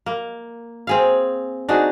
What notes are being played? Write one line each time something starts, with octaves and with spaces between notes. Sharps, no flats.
A#3
C4 G#4 F5
D4 D#4 F#4 G#4